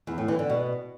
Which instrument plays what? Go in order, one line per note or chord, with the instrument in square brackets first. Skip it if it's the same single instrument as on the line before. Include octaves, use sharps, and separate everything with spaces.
[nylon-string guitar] E2
A2
E3
D3
B2